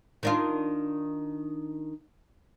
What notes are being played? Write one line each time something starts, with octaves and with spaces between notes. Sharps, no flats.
D#3 D4 F4